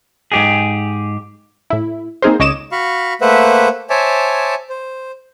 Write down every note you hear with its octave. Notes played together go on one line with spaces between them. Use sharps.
G#2 G4 G#4
A2 E4
A#3 C4 D#4 G#4 A#4 C5
C#2 C#5 D#5 D6 E7
F#4 F5 B5 C#6
A3 A#3 B4 C5 E5 F#5
C5 C#5 E5 G#5 A5 D6
C5